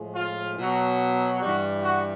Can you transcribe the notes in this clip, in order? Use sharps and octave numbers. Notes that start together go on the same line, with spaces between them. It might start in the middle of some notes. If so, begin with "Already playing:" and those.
Already playing: A2 F3 G#3
F4
B2 F#3
G2 E3 G3 F#4
F#4